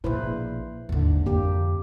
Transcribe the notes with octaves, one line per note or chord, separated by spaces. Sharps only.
A#1 B2 E4 B4 C5
G#1 D#2 D3
F2 A#3 G4